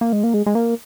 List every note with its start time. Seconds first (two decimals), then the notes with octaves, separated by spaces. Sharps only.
0.01 A#3
0.13 G#3
0.24 A#3
0.34 G#3
0.46 G#3
0.55 A#3